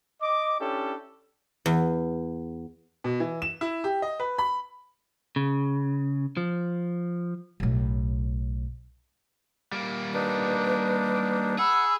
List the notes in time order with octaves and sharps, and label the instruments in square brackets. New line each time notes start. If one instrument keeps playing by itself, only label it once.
[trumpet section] D#5 D6
C#4 D4 E4 G4 A4
[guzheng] E2
[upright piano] B2
E3
E7
E4
G4
D#5
B4
B5
[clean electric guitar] C#3
F3
[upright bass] B1 A2
[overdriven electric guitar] G3 A#3
[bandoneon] D4 D#4 [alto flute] B4
[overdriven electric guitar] G#4 [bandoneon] F#5 [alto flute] B5 [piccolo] E6